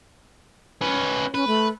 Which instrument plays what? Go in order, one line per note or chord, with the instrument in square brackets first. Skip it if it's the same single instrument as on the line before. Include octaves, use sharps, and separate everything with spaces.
[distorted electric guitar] C#4 B4
[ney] C#4 [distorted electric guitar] B4
[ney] A3